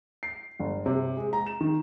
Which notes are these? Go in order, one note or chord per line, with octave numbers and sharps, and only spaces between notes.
C7
G1
C3
G#3
A#5
E7
D#3